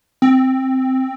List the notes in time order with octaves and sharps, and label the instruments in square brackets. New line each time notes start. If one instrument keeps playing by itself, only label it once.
[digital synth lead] C4